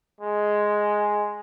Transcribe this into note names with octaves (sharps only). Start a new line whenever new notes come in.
G#3